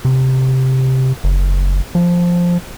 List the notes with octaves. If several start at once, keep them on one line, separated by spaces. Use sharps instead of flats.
C3
F#1
F3